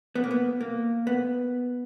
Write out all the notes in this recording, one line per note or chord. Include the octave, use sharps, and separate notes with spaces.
B3
A#3
B3
A#3
B3